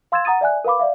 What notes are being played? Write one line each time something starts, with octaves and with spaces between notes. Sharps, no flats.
F5 C6 E6 G#6 A6 E7
F#5 A#5 D#6 A6 D#7
D5 E5 G#5 F#6
A#4 B4 F5 B5 D6
D5 E5 F5